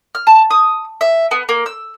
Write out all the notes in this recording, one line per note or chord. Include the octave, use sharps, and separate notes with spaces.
F6
A5
D#6
E5
B3
A#3
E6